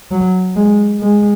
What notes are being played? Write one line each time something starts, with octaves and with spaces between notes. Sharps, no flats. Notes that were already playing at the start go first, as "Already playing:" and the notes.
F#3
G#3
G#3